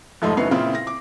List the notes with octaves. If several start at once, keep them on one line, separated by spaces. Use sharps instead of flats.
F1 G#2 F3 A3 D#4 C6
F#1 B3 C#4 D#4 E4 C7
A#2 C#3 C4 E4 F4
A#6
D6